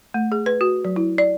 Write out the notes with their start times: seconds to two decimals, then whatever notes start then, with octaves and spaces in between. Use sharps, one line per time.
0.14 A3
0.32 G#4
0.46 B4
0.61 F#4
0.85 F#3
0.96 E4
1.18 D5